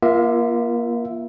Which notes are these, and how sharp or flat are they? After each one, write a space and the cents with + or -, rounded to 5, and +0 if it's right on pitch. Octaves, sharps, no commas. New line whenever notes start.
A#3 +30 F4 -25 E5 +0